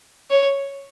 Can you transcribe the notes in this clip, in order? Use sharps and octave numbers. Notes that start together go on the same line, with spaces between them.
C#5